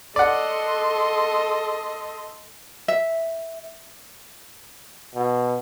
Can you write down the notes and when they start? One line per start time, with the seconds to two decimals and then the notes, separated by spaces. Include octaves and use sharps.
0.16 A4 D5 D#5 F#5 C6
2.88 E5
5.15 B2